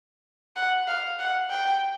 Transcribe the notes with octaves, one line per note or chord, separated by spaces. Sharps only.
F#5
F5
F#5
G5